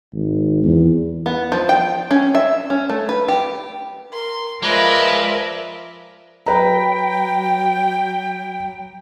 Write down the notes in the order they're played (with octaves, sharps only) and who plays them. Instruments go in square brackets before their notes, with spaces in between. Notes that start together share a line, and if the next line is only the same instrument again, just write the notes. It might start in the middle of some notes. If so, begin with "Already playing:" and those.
[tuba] G#1
E2
[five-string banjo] B3
F3
G5
C#4
E5
C#4
A3
B4
G4
[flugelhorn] A#4 [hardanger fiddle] C6
[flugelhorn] F3 [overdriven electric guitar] G#3 [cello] A#4 E5 [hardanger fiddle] B4 D5
[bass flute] F#3 [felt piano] B4 A#5 [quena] G5